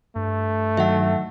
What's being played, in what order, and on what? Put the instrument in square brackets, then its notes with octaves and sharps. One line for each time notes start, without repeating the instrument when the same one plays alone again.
[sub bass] G2 [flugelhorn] A3
[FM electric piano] D#3 F#3 D#4 [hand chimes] E5 F#5